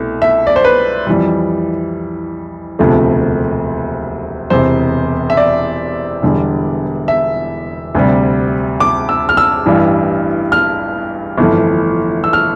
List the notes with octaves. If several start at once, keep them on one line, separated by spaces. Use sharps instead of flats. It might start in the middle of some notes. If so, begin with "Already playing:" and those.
Already playing: C2 B2 A3
E5
D5
C5
B4
F2 E3 G3
E1 D2 C3 F3 A3
E1 E2 C3 C5
E5
D5
E1 E2 D3 G3
E5
D2 C3 G3
D6
E6
F6
E6
A1 G2 E3 G3
F6
G1 F2 E3 A3
E6
F6